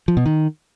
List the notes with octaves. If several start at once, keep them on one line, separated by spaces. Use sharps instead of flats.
F3
B2
D#3